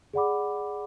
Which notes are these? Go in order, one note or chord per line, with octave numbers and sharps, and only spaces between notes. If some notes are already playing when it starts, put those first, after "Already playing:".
G#4 D5 F#5 B5 D6